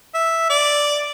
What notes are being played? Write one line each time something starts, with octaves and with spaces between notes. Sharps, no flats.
E5
D5